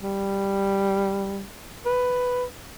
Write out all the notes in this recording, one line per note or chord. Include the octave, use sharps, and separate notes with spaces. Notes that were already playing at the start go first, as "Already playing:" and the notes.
G3
B4